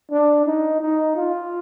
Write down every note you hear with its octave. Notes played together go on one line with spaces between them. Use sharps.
D4
D#4
D#4
F4